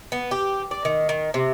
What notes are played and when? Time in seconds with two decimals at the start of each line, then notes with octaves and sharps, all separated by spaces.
0.12 B3
0.31 G4
0.71 D5
0.85 D#3
1.09 D#3
1.34 C3